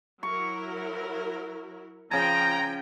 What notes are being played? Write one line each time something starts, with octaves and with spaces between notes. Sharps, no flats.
F#3 E4 A#4 C#6
C#3 F3 G5 G#5 A#5